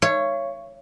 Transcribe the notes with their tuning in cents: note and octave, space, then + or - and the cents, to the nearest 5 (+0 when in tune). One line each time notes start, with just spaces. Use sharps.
C#5 +0 F5 -45